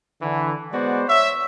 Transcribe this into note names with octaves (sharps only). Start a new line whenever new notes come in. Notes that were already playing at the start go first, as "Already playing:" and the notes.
D3 E3
G#3 B3 F#4 C5 D5
C#5 E5